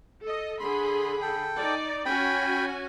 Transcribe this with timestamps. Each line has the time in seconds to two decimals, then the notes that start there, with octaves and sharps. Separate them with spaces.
0.22 A4 D#5
0.60 D3 G#4 B5 C6
1.22 A4 G5
1.59 D#4 D5
2.06 C#4 F#4 G5 G#5 B5